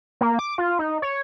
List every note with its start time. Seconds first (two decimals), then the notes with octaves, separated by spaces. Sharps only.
0.21 A#3
0.39 D6
0.58 F4
0.79 D#4
1.02 C#5